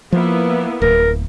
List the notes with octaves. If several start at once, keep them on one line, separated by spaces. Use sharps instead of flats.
F3 A#3 B3 E4
D1 A#4